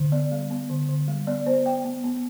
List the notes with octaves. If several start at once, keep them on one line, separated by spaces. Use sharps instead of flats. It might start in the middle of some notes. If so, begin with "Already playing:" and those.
Already playing: D3
B3 D5
G3
B3
D3
D3
G3
B3 D5
B3 C5
B3 G5
B3
B3